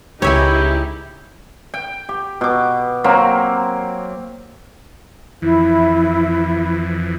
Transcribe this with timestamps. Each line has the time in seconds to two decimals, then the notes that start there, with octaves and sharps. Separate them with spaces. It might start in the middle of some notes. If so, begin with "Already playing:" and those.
0.22 C#2 D#4 E4 G4 C#5 E5 G#5
1.74 G5
2.09 G4
2.41 B2 D6
3.04 F#3 A#3 C4
5.42 F2 E3 E4